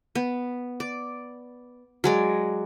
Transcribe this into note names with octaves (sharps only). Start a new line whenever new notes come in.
B3
D5
F#3 G#3 D5